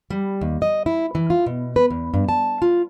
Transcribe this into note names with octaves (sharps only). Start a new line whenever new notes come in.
G3
D#2
D#5
E4
E3
F4
B2
B4
E2
G2
A5
F4